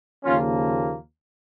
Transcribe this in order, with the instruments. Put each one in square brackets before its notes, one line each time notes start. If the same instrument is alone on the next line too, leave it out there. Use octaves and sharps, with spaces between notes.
[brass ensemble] D#2 C#3 F3 A#3 C#4 F4